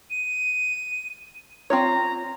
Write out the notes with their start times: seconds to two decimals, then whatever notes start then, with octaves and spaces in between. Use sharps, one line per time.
0.10 D#7
1.70 C4 F4 C#5 A#5